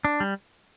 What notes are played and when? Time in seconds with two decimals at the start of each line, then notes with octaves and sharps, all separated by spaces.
0.05 D4
0.20 G3